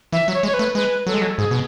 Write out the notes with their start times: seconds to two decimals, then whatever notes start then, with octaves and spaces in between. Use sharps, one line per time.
0.12 E3 E5
0.28 F#3
0.34 C#5
0.43 G#3
0.47 C#5
0.54 B4
0.59 A3
0.75 G#3 B4
1.07 F#3 A4
1.14 G#3
1.22 F#3
1.38 G#2 G#4
1.51 B2